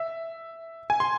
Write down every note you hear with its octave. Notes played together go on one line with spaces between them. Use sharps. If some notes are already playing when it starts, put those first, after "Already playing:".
Already playing: E5
G#5
C6